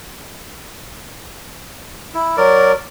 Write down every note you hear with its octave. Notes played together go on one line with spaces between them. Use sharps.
E4
F#3 A#4 D5